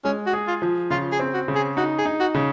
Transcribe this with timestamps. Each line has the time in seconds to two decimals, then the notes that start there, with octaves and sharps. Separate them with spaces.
0.05 G#3 C#4
0.26 F#4
0.33 G#4
0.48 F4
0.62 F3
0.90 C#3 F4
1.12 G#4
1.19 C4
1.34 F#4
1.48 C#3
1.55 G#4
1.77 D#4 F#4
1.98 G#4
2.05 D#4
2.20 F#4
2.34 C#3